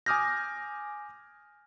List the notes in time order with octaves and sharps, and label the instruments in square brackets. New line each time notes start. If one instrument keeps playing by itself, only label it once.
[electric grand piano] G#5 D6 D#6 F6 G6 A#6